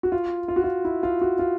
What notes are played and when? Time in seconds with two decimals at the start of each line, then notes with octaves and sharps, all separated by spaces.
0.03 F#4
0.12 F4
0.48 F4
0.56 F#4
0.64 F4
0.85 E4
1.03 F4
1.21 F#4
1.39 F4